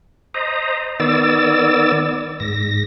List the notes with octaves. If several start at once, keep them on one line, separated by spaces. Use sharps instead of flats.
C5 D#5 A#5
D#3 B3 D5 E6 A6
G#2 A#6